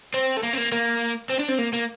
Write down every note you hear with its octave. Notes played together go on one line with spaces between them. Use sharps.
C4
A3
A#3
C4
A#3
A#3
C4
D4
C4
A#3
A#3